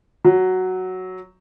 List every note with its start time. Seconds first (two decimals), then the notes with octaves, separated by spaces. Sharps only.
0.25 F#3